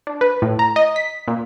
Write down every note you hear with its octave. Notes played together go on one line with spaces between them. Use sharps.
D4
B4
A2
A#5
D#5
B6
A#2